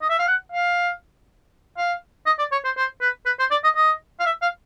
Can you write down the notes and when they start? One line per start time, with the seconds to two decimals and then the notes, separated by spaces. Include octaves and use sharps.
0.02 D#5
0.10 E5
0.19 F5
0.28 F#5
0.52 F5
1.78 F5
2.26 D#5
2.39 D5
2.52 C#5
2.65 C5
2.77 C5
3.01 B4
3.26 B4
3.40 C5
3.51 D5
3.64 D#5
3.76 D#5
4.20 F5
4.26 E5
4.42 F5